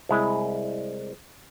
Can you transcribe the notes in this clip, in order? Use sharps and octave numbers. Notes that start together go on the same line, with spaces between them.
C2 G#3 E4